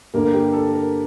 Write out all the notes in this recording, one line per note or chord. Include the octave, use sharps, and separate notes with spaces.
G2 D3 G3 A#3 A#4
G4
A4
A#4